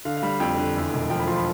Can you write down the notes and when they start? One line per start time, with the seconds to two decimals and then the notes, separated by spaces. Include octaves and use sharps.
0.05 D3 F5
0.17 F5
0.23 G3
0.28 F5
0.40 F2 G5
0.58 D3
0.75 E2
0.93 E1
1.10 F3 G5
1.19 B5
1.27 F3 C6
1.36 B5